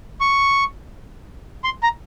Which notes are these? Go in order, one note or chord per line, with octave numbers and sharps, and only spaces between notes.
C#6
C6
A#5